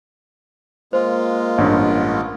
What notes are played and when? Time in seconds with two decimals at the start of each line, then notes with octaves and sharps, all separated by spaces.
0.93 G#3 A#3 F4 C5
1.58 A1 G2